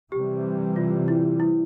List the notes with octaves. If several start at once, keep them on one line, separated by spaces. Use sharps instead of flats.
C3 E3 G3 G4
F4
E4
E4